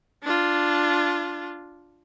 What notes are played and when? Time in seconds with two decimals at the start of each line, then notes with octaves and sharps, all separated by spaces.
0.23 D4 F4